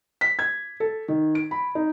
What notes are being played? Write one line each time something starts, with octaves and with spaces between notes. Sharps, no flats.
B6
G#6
A4
D#3
D7
B5
D#4